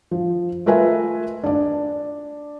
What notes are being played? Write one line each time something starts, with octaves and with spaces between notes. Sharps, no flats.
F3
A3 F4 A#4 B4 E5 G#5
D4 D5